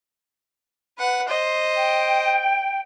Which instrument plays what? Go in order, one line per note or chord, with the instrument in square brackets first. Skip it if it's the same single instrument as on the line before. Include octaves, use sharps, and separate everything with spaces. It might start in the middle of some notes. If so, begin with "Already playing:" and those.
[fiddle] B4 F#5
C5 D#5
[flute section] G5